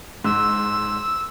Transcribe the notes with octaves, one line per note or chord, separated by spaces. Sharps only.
G#2 E6